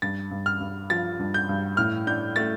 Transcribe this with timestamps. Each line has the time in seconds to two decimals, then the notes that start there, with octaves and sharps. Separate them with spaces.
0.02 G2 A6
0.31 G2
0.46 F6
0.60 G2
0.90 F3 A6
1.19 G2
1.34 G6
1.49 G2
1.77 A2 F6
2.07 D4 G6
2.36 A3 A6